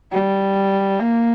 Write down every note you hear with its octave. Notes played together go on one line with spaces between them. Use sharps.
G3
A#3